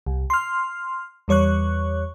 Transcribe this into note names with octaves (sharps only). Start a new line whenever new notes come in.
C2
C6 F6
E2 G3 C#5 C#6 F#6